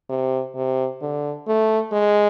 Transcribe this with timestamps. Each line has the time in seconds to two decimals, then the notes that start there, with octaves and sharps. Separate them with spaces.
0.10 C3
0.55 C3
1.01 D3
1.48 A3
1.93 G#3